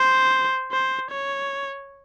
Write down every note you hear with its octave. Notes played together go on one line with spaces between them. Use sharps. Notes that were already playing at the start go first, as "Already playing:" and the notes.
Already playing: C5
C5
C#5